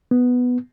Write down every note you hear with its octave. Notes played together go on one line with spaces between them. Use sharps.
B3